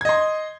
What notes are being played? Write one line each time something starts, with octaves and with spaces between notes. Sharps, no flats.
D#5 C6 G#6